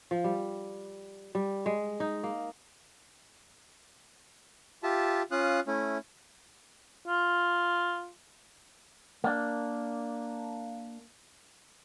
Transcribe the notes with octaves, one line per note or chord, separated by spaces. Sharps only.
F3
G3
G3
G#3
D#4
A#3
F4 G4 E5 A5
C#4 F4 F5 D#6 F#6
A3 C#4 E4
F4
A#3 D4